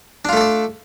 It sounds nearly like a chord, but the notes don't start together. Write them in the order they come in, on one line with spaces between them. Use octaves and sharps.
D4 F4 A3 A4 D5